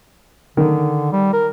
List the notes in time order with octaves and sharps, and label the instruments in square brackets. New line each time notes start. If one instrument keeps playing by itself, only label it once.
[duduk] D3 [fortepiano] D#3
[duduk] G3
A#4